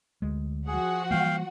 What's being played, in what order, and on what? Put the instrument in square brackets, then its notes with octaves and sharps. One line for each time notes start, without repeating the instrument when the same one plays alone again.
[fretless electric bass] D2 G#3
[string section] F3 F#4 F#5 [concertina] G#4
[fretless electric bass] E3 G3 A#3 [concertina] F5 G5